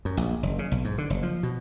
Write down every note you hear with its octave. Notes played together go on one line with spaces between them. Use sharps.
F#2
A#1
F#1
C#3
B1
G#2
D3
F#1
F3
B2